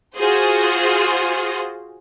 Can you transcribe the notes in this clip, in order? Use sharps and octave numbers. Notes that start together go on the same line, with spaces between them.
F4 F#4 G#4 C5